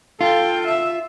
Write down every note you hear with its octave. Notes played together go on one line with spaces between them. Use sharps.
F4 A4 G5
E5